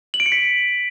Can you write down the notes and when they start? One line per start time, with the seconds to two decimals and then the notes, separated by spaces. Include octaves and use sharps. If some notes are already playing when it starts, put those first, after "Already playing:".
0.14 F#7
0.20 D7
0.26 C#7
0.32 B6